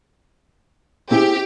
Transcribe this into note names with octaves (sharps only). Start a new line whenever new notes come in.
C4 E4 G4 G#4